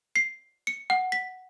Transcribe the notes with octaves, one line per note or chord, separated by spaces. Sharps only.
C7
C#7
F#5
B6